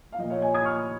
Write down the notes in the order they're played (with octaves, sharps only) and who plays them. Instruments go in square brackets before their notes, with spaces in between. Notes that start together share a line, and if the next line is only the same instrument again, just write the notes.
[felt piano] F5
A#2 F3 D#5
C#5 F5
D#5 G#5
D#6 G#6
C#6 F6